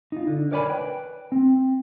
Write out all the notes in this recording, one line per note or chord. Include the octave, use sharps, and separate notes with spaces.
D#4 F4
D3
A#4 C#5 D5 G#5 A5 B5
B4 G5
C4